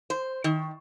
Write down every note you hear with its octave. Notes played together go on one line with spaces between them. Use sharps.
C5
D#3